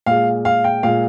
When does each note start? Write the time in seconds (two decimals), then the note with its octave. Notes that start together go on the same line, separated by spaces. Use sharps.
0.06 A#2 G#3 F5
0.45 F5
0.64 G5
0.83 A#2 G#3 F5